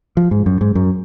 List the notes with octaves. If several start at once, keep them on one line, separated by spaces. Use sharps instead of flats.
F3
G#2
F#2
G#2
F#2